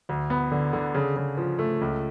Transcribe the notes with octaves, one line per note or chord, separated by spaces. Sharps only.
D2
B3
D3
D3
C#3
C#3
F3
A3
C#2